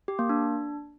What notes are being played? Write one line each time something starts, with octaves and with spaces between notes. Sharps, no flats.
G4
A#3
D4